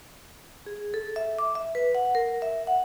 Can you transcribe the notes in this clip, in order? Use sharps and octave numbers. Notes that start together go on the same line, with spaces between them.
G#4
A4
E5
D6
E5
B4
F#5
A#4
E5
F#5